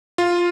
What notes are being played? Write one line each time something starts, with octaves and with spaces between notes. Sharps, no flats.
F4